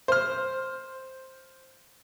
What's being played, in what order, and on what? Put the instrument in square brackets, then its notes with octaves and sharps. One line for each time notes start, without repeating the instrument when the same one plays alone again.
[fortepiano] C5 F6